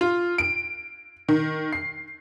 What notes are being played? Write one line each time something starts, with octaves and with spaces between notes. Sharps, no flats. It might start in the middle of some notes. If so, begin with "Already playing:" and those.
F4
D7
D#3
C7